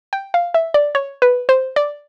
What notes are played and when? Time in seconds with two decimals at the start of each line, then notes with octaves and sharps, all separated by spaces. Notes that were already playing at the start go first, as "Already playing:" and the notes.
0.13 G5
0.34 F5
0.54 E5
0.74 D5
0.95 C#5
1.22 B4
1.49 C5
1.76 D5